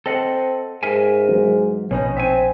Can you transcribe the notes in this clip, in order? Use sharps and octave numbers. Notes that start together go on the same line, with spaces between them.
C4 A4 D#5 F#5
G#2 A#4 E5 G#5
E3 F#3 G#3
A#1 B2 B3 C#4 D#4
C4 E5 G#5